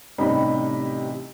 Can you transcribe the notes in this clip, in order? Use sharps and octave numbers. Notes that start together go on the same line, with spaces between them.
A1 C3 G3 D#4 B5